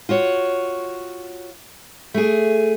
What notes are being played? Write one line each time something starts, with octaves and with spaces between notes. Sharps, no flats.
F4 F#4 C#5
A3 G#4